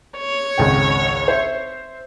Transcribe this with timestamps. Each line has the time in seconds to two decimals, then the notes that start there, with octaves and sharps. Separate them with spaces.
0.17 C#5
0.58 G#1 C#2 G5
1.28 C5 E5